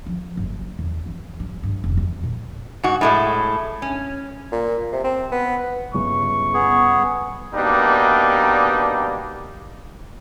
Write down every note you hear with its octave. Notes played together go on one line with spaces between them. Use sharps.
F3
F#1
E2
E3
G3
G2
F1
E2
A#2
G#2 F#4
A2 G#3 A3
C#4
A#2
C3
C4
B3
G1 C#3 C#6
B3 G#4
B2 G3 A#3 D4 D#4